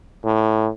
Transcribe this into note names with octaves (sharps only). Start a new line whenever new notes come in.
A2